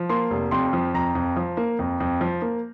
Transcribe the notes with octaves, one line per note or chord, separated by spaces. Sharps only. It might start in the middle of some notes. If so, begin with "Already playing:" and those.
Already playing: F3
A#3 C6
F1
F2 C6
F3
F2 A#5
F2
F3
A#3
F2
F2
F3
A#3